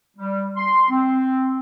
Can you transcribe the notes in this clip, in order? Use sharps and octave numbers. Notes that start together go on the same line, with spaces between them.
G3
C6
C4